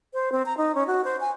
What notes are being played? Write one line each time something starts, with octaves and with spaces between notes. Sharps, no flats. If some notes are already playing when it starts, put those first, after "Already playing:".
C5
C4
A#5
D#4
C#4
F#4
C5
G#5